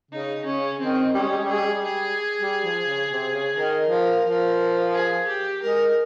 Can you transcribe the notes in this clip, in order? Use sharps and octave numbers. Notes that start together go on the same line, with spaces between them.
C#3 D#4
C#3 C#4
D#3 C4
G3 C#4
G#3
G3
G#3
G3
G#3 G#4
G3
G#3
G3
G#4
G3
F3
C#3
C3
C#3
D#3 A#4
F3
F3
G#4
G4
G#3 A#4